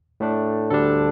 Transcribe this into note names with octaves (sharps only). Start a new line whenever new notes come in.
A2 A3 D4
D2 D3 G3 D4 A4